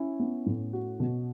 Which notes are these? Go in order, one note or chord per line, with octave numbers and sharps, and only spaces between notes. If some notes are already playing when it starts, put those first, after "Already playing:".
Already playing: C#4 E4
B3
A2
F#4
B2